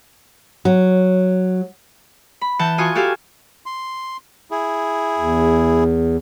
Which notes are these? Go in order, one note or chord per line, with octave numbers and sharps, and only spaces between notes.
F#3
B5
E3 F#5 A5 G6
F4 F#4 G#5 C#6 D#6
F#4 G4 A4 F5 G#5
C6
E4 G#4
E2